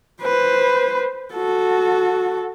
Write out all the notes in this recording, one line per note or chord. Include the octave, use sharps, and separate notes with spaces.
B4 C5
F#4 A4